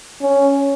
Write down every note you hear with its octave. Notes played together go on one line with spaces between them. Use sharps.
C#4